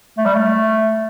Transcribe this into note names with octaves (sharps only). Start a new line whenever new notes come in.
A3
G3
A3